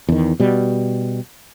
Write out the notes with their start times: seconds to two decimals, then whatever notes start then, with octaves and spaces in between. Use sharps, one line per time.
0.09 E2 D#3
0.40 B2 G3